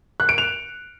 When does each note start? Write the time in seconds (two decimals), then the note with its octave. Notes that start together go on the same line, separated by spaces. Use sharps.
0.20 F#6
0.29 D7
0.38 F7